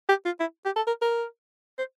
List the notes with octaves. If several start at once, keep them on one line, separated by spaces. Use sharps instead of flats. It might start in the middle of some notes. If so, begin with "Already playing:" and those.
G4
F4
E4
G4
A4
A#4
A#4
C5